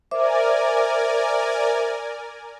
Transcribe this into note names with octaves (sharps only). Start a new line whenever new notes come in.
A#4 C5 D5 E5 G#5 D6